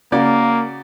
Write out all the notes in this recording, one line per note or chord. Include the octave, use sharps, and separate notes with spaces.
C#3 A#3 F#4 D5